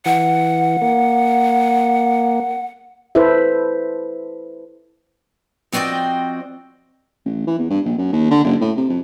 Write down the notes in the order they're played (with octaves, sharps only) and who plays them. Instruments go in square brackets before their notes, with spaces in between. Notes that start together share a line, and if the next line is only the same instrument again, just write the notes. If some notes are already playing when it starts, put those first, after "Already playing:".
[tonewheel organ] E3 [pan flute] F#5
[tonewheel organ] A#3
[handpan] E4 A4 B4 C5 E5
[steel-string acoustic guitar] F3 C4 F#4 D5 D#5 G5
[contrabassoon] A1
E3
E2
G2
A#1
F#2
D#2
D3
F#1
A2
C3
F2